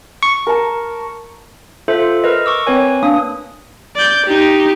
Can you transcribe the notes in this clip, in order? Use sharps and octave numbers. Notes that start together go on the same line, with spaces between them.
C#6
A#4 A5
F4 A4 C5 E5
A#4 B4 D#5
C#6 D6 E6
C4 B4 C#5 G#5
A#3 D4 D#6
D5 G6
D#4 G4